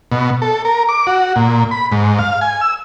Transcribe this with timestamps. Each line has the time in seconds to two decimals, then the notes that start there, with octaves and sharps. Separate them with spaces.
0.12 B2
0.42 A4
0.65 A#4
0.89 D6
1.07 F#4
1.36 A#2
1.71 B5
1.92 G#2
2.19 F5
2.41 G#5
2.61 E6